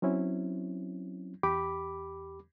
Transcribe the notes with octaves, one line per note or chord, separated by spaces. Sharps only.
F#3 C4 C#4 E4
E2 G4 B5 D6